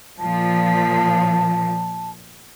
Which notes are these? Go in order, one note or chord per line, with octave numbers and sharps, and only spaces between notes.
A#2 F3 A5